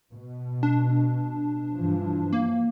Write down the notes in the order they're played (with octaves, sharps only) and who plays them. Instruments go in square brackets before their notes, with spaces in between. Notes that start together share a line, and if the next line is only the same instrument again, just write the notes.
[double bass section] B2
[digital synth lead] D4
[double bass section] G2 E3 F3
[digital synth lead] A#3